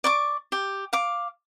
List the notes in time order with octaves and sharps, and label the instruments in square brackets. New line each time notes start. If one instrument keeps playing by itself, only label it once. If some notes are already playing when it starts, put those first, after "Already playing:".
[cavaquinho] D5 C#6 D6
G4
F5 D6